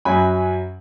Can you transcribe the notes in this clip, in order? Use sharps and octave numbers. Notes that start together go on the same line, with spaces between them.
F#2 F#3 C#4 G#5 B5